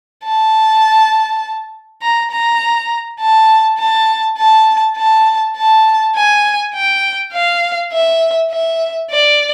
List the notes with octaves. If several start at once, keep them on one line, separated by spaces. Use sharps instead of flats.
A5
A#5
A#5
A5
A5
A5
A5
A5
G#5
G5
F5
E5
E5
D5